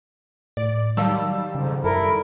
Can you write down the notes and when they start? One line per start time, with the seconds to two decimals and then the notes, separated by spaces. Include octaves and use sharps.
0.57 A2 D5
0.97 D#3 F#3 G3 F5 A5 E6
1.55 F2 G#2 C#3
1.84 F#2 E4 A4 A#4